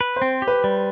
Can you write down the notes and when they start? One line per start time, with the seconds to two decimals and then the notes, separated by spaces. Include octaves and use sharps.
0.01 B4
0.16 C5
0.22 C4
0.42 G4
0.47 B4
0.64 G3